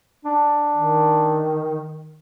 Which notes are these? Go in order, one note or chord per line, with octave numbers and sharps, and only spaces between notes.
D4
D#3